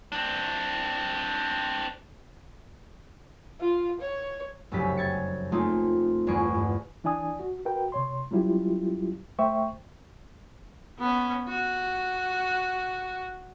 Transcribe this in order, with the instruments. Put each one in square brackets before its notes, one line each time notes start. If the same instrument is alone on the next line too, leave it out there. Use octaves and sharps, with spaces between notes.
[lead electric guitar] C4 D4
[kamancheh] F4
C#5
[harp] F1 C2 F#2 C#3 G4 B6
G#6 A6 C#7
A3 A#3 C4 D#4 F4 G#4
G1 E2 G#4 C#6 D7
G2
[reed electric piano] E3 D4 D5 G#5 D#6
F#4
F#4 A#4 B4 G5
C3 C#5 C6
F#3 G3 C#4 E4 F4 G4
A3 C5 E5 G5 C#6
[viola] B3 C#4
F#4